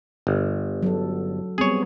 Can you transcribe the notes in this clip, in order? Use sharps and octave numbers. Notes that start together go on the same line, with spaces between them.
G1
F#3 A4
G3 B3 C4 G#4 C#5